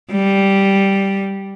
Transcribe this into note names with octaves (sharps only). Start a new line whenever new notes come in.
G3